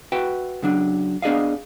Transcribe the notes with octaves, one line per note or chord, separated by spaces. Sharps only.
F#4 B4 E5 F#5 G5
C#3 F#3 D4
B3 D4 G#4 D5 D#5 F5